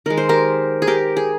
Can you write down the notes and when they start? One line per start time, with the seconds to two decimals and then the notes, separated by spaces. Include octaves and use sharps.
0.06 D#3 G#3 A#4
0.17 C5
0.29 G4 A#4
0.82 G#4
0.87 G4 A#4
1.17 G#4